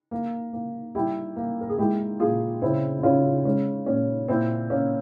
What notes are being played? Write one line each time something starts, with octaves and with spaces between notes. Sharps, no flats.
A#3
A#3
G3 E4 G4
A#3
A#4
G#4
G#3 E4 G4
A#2 F4 G#4
C#3 C4 E4
E4
C#3 C#4 F4
G#3 C#4
A#2 C#4
A#2 C4 E4
A#3 C#4